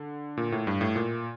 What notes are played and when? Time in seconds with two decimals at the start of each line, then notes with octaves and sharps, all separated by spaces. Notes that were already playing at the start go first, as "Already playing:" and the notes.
Already playing: D3
0.37 A#2
0.52 A2
0.67 G2
0.81 A2
0.96 A#2